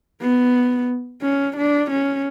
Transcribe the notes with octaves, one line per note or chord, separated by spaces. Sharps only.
B3
C#4
D4
C#4